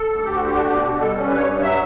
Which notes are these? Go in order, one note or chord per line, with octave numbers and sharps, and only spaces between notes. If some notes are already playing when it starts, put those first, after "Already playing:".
Already playing: A4
D2
D2 G4
D3 F#4
G4
D4 F#4
G4
B2 F#4
B2
G3 A4
C#4
G2 B4
C#5
G2
F#3 E5